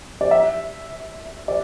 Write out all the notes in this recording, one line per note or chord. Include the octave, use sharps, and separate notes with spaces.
D5
E5
D5